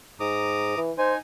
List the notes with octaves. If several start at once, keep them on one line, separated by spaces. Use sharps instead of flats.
G#2 A#5 D6 D#6
E3
D#4 C5 G#5